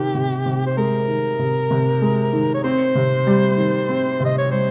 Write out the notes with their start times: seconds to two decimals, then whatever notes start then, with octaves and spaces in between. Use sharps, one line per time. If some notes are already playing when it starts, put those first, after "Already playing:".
Already playing: C3 D#3 G4
0.14 C3
0.46 C3
0.66 C5
0.77 G#3 A#4
1.08 D#3
1.39 C3
1.71 C3
2.01 G#3
2.33 D#3
2.54 C#5
2.64 C4 C5
2.95 C3
3.27 G3
3.57 D#3
3.89 C4
4.20 C3 D#5
4.38 C#5
4.51 G3 C5